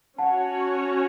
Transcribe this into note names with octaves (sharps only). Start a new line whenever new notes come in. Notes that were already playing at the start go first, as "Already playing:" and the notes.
C#4 F#4 C#5 F#5 A5